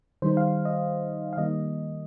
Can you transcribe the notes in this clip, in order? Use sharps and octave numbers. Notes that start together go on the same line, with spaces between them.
D#3 G3 D#4 C5
F5
D#5
F5
D#3 G3 A#3 D#4 D#5